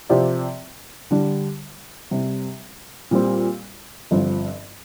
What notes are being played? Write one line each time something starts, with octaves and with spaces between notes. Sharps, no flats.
C3 F3 C4 G4 D5
D3 G3 D4
C3 G3 C4
A#2 G3 C4
G1 G2 F3 C4